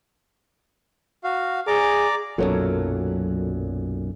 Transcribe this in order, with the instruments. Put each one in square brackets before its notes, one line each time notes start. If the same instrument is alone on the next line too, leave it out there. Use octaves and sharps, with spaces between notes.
[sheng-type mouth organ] F#4 F5
[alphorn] G#4 [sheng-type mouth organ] D5 A#5 D6
[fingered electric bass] B1 F#2 A#2 [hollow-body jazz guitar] F#3 [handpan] A4 A#4 C#5